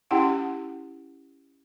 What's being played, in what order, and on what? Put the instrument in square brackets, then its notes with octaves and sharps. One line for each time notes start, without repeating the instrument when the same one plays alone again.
[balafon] C#4 E4 G4 F#5 G5